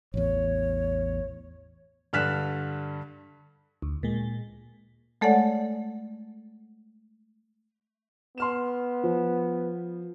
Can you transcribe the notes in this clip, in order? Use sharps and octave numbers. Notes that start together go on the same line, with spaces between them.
A1 E2 C#5
G2 D3 F6 F#6 B6 E7
D2
A#2 G#3
G#3 A3 A4 C#5 D5 F#5
B3 C6 F6 E7
F3